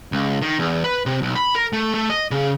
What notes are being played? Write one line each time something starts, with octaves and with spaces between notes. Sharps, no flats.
C#2
D#3
E2
B4
C3
B1
B5
A#4
A3
A3
D#5
C#3